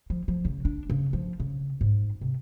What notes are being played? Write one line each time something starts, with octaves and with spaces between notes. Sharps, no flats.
F3
F3
C#3
D4
C#3
F3
C#3
G#2
C3